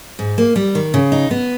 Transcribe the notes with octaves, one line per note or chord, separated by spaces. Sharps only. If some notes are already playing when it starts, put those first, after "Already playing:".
G#2
A#3
G3
D#3
C#3
D#4
B3